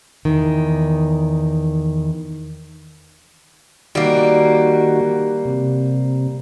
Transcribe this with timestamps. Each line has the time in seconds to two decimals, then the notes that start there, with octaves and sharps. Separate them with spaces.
0.25 E2 D#3
3.95 D#3 G3 A#3 F#4
5.45 C3